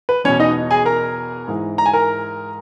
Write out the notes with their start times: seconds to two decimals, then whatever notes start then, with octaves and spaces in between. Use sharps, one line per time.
0.09 B4
0.24 E2 B2 C#4 C#5
0.40 D#4 D#5
0.71 G#4 G#5
0.85 A#4 A#5
1.48 G#2 E3
1.78 A#5
1.86 G#5
1.93 A#4 A#5